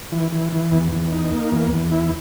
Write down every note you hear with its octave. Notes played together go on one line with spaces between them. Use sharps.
E3
E3
E3
E2
E2
D#4
A#3
E2
E2
E4